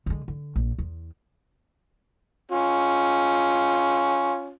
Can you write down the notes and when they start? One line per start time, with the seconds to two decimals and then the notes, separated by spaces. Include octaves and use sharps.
0.06 D3 G#3
0.28 D3
0.56 A#1
0.79 E2
2.52 C#4 F4